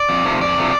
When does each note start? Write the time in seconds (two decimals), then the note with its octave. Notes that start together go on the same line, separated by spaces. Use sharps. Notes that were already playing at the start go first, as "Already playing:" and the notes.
Already playing: D5
0.09 F2
0.25 C3 F3 A3
0.41 F2 D5
0.58 C3 F3 A3